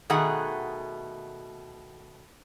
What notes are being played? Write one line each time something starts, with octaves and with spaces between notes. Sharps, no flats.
B2 D#3 A3 G#4 F#5